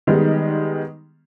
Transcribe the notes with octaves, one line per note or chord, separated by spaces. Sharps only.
D#3 G3 G#3 B3 D#4